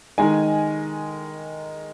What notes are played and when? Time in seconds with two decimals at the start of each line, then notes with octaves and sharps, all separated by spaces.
0.18 D#3 G#3 D#4 G#5